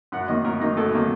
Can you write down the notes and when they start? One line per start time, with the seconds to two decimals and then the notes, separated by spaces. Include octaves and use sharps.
0.12 F#2 F#5
0.28 D#3 A#3 D#4 D#5
0.44 F#2 A#4
0.60 D#3 A#3 D#4
0.77 F#2 A4
0.93 D#3 A#3 D#4